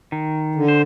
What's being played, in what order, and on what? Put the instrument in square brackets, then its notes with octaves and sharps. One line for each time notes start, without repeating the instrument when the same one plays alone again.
[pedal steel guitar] D#3
[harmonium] D3
[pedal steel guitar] C5